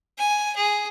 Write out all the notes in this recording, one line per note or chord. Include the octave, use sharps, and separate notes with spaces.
G#5
G#4